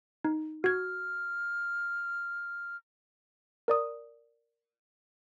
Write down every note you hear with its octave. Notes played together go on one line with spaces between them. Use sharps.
D#4
F#4 F6 G#6
A#4 D5 D#6